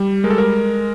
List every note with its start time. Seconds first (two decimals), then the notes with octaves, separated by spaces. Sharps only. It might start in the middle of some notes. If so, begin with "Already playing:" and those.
Already playing: G3
0.24 G#3 A#4
0.30 A4
0.38 A#4